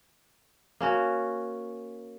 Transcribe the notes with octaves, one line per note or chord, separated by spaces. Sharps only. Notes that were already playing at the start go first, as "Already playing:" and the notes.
A#3 C#4 F#4